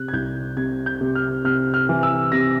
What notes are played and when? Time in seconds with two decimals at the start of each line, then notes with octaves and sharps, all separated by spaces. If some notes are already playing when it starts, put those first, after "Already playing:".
Already playing: C3 F#6
0.08 G#6
0.13 C2 G6
0.57 C3 G#6
0.86 G6
1.01 C3
1.15 F6
1.44 C3 F6
1.74 F6
1.89 E3
2.03 E6
2.32 C3 A#6